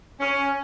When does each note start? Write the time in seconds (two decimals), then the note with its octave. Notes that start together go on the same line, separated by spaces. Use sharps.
0.20 C#4